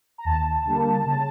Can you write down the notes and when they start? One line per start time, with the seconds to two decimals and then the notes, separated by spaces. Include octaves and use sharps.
0.18 A#5
0.25 D#2 A5
0.65 D3 G3 A#3
1.04 C#3